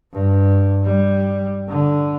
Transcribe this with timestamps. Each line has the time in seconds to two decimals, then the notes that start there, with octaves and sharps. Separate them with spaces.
0.13 G2
0.83 G3
1.69 D3